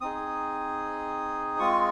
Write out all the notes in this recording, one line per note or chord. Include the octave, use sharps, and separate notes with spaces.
C4 D#4 G#4 D#6
G#3 C4 F4 C#6